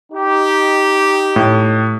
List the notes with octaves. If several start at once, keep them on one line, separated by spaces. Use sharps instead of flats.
D#4 G4
A2